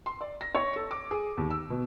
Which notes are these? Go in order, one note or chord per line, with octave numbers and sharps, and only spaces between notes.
C6
D5
A#6
C#5
A4
D6
G#4
D#2
E6
B2